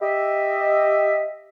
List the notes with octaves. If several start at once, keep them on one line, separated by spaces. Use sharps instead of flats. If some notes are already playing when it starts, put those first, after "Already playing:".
G4 D#5 E5